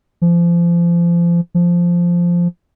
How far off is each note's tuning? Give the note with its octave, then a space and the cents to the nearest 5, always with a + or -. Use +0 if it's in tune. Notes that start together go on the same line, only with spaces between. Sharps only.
F3 -30
F3 -5